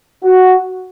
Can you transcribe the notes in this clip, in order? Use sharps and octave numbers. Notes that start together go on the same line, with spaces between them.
F#4